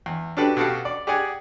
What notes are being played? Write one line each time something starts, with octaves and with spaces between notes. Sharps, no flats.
E2
D4 F#4 G4 A4 B4
B2 F#4 G4 A4 F5 F#5
D5
G4 G#4 D5 F#5 G#5